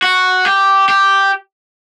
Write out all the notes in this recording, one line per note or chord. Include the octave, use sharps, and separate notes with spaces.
F#4
G4
G4